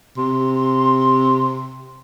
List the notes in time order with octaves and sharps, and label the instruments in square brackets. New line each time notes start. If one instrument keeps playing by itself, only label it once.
[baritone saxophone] C3 [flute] C6